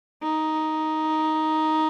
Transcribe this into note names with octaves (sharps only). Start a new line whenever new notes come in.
D#4